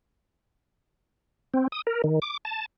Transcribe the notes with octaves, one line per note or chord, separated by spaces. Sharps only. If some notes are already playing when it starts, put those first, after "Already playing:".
C4
D#6
A#4
D#3
D6
A5